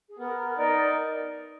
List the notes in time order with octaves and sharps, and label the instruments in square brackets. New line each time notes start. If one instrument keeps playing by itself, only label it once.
[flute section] G#4
[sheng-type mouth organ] B3 [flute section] A#4
[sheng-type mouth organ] D#4 A#4 [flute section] D5